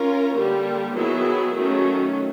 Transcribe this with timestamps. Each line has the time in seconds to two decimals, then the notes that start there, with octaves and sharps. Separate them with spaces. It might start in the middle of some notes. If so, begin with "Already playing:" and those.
Already playing: C#4 F4 A#4
0.35 D3 G3 A#3
0.94 D#3 F#3 B3 E4 G#4
1.54 D#3 F#3 A3 C#4